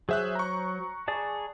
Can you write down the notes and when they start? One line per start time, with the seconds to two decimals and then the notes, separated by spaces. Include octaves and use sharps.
0.09 F#3 G#4 C5 E5 F#6
0.35 A#5 C#6
1.08 G#4 D5 A5